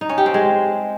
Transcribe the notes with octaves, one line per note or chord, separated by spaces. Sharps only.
D#4
C#4
G4
C4
G#3